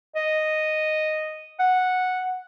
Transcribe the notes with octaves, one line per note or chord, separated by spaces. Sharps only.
D#5
F#5